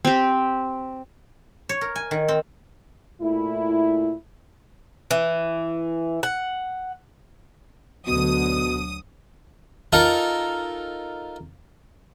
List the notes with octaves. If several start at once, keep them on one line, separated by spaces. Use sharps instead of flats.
C4 G4
C#5
A#4
G#5
D#3
C4
A#2 A3 E4
E3
F#5
D2 B2 D3 F#3 D#6
D#4 F4 A4 A#4